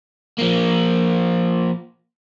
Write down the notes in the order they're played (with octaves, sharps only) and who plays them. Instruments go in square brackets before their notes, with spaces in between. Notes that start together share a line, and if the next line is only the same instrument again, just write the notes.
[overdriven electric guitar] F3 A#3